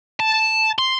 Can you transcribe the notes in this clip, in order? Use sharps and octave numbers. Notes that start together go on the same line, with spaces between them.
A5
C6